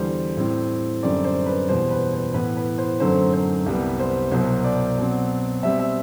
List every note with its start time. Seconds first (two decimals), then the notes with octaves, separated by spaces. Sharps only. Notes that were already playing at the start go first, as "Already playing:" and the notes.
Already playing: E2 D3 G3 C5
0.37 A2 G3 C4
1.03 F#2 D3 G3 C4 D5
1.24 C5
1.46 B4
1.69 E2 B2 G3 C5
1.91 B4
2.13 C5
2.34 A2 E3 B3 B4
2.57 B4
2.78 C5
3.00 F#2 D3 F#3 A3 C4 C5
3.33 C5
3.66 C2 C3 G3 B3
3.99 C5
4.31 C2 B2 F#3 C5
4.64 D5
4.97 B2 F#3 C4
5.63 B2 G3 C4 E5
5.80 E5